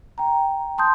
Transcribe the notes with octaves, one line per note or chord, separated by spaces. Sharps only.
G5 A#5
A5 C6 D#6 G6